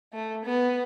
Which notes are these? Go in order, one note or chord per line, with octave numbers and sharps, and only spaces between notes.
A3
B3